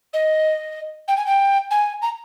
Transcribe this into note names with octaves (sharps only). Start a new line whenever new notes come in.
D#5
G5
G#5
G5
G#5
A#5